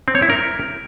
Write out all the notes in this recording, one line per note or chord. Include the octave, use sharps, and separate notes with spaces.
C4
C#5
E4
A#4